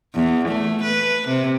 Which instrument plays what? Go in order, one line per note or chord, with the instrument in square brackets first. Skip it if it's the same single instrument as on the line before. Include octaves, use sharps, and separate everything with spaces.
[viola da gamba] E2
A3
B4
C3